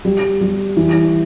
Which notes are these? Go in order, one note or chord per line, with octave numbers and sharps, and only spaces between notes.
G3
G3
E3